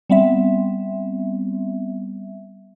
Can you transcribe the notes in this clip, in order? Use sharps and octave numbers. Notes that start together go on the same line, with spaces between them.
G3 B3 C4 E5